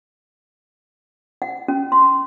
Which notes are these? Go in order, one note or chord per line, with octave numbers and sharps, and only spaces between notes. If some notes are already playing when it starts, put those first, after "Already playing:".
F#5
C#4
C6